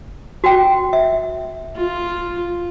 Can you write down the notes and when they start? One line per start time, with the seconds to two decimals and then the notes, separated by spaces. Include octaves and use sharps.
0.44 F#4 G5
0.93 E5
1.76 F4